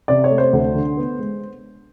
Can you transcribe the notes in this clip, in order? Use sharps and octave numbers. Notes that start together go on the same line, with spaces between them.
C3 D5
C#5
A3
C5
D2
D3
B3
G#3